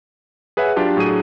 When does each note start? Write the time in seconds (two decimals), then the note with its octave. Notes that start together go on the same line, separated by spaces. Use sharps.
0.57 G#4 B4 C#5 E5 F#5 G#5
0.76 F#3 D4 F4 G4 A5
0.97 A2 F#3 D4 G#4 D#7